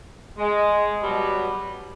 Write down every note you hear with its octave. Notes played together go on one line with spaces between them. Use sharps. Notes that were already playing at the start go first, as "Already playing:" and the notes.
G#3
B2 F#3 G3